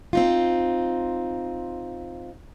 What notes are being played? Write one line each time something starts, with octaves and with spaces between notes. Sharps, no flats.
C4 D#4 F4